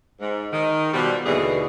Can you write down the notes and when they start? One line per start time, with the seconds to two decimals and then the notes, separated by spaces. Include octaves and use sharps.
0.20 G#2
0.53 D#3
0.93 B2 F3 G3
1.26 D#2 B2 D3 E3 G#4